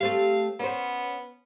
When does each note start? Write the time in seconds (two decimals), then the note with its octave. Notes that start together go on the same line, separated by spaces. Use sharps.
0.01 A3 C4 G4 F5
0.60 B3 C#4 C5